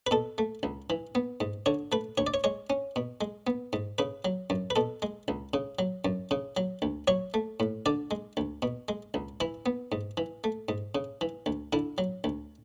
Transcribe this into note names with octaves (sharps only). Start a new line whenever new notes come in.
B4
B2 A4
A3
C#2
E3
B3
G#2
D3 C#5
A3 B4
D2 C#5
D5
C#5
G#3 C#5
C#4
B2
G#3
B3
G#2
C#3 B4
F#3
F#2
B4
B2 A4
G#3
C#2
C#3
F#3
F#2
C#3
F#3
D2
F#3 C#5
A3
A2
D3 D5
G#3
D2
B2
G#3
C#2
E3 E4
B3
G#2
E3
A3
G#2
C#3
E3
D2
D3 E4
F#3
D2